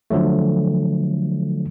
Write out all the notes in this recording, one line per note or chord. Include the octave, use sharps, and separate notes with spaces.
D3 F3 F#3 A3